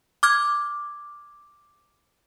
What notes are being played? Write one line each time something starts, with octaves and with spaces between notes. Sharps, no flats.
D6 F6 G#6